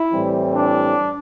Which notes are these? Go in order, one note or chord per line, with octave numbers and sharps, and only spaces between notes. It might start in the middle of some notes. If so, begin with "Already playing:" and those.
Already playing: E4
A2 E3 G3 C4
D4